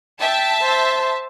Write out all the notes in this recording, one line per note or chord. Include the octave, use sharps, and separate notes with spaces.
E5 G5 A5
C5